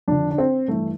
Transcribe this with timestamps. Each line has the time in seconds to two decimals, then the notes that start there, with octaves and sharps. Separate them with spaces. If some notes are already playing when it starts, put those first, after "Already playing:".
0.08 F2 D3 D4
0.31 D4
0.38 C4
0.68 G2 E3 A3